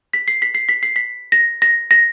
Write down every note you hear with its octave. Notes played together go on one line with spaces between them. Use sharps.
B6
C7
B6
C7
B6
C7
B6
A#6
A#6
A#6